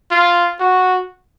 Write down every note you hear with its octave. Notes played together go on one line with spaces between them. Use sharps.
F4
F#4